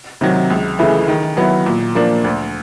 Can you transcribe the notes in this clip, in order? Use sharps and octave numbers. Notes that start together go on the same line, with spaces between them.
C3 D#3 F#3
C#2
C#3 E3 A3
D#3
F#3 B3 E4
A#2
F3 A#3 D4
D2